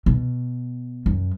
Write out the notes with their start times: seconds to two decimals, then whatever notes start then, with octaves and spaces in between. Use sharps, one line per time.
0.06 B2
1.06 F#2